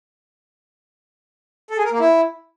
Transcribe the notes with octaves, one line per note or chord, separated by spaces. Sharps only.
A4
G#4
A#4
A#3
E4